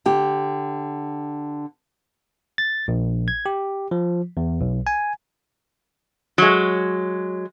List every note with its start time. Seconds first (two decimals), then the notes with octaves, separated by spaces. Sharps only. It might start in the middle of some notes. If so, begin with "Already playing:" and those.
0.06 D3 G4
2.58 A6
2.88 A#1
3.28 G#6
3.46 G4
3.91 F3
4.37 E2
4.61 B1
4.87 G#5
6.38 F#3 G#3